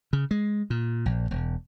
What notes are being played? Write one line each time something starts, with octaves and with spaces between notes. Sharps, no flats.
C#3
G#3
A#2
A#1
E1